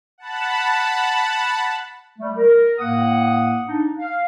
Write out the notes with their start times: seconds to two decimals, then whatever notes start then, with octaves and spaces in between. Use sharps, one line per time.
0.18 F#5 A5 B5
2.19 G3 A3
2.37 A#4
2.79 A2 A#3 F#5 D#6
3.66 D4 D#4
3.99 F5